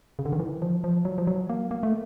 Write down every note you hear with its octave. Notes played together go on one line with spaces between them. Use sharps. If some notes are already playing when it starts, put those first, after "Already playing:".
C#3
D3
D#3
E3
F3
F3
F#3
F3
F#3
A#3
A#3
A3